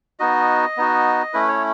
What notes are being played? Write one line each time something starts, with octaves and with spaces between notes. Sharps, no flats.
B3 D#4 F#4 D#5
B3 D#4 F#4
A3 C#4 E4 B4
C#5